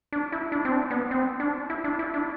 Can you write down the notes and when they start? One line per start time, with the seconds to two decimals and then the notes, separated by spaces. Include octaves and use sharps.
0.12 D4
0.32 E4
0.52 D4
0.65 C4
0.72 D4
0.91 B3
1.11 C4
1.40 D4
1.70 E4
1.84 D4
1.99 E4
2.14 D4